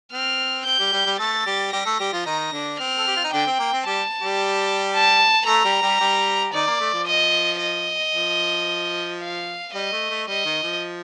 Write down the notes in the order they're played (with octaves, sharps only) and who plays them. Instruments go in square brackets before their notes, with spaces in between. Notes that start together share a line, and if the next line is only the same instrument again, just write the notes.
[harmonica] C4 [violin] F6
[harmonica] C4 [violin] G6
[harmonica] G3 G4
G3 G4
G3 G4
[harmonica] A3 A4 [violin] A6
[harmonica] G3 G4
[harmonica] G3 G4 [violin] A#6
[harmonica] A3 A4
G3 G4
F3 F4
[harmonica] D#3 D#4 [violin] A#6
[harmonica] D3 D4
[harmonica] C4 [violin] F6
[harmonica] A4
G4
F4
D#4
[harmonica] D3 D4 [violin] G5
[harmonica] C4
A#3
C4
[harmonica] G3 G4 [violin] A5
[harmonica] G3 G4
[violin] A5
[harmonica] A3 A4 [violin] A#5
[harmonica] G3 G4
G3 G4
G3 G4
[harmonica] D#3 D#4 [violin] D5
[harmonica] A#3
A3
F3
[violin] D#5
D#5
[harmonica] F3
[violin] F5
[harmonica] G3 [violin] D#5
[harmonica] A3
A3
[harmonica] G3 [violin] D#5
[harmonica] D#3
F3